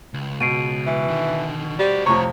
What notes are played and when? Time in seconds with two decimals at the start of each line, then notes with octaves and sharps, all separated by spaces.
0.14 C#2
0.41 B2 C7 D7 D#7
0.86 E3
1.08 D3 D#3
1.79 G3 F#4 C5
2.06 F2 A2 C3 C#5 A#5 C#6